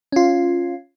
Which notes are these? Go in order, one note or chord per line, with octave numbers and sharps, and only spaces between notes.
C#4 F4